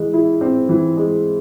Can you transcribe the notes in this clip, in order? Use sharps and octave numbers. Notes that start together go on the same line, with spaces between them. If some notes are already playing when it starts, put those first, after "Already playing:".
Already playing: E3 G#3
E4
C4
E3
G#3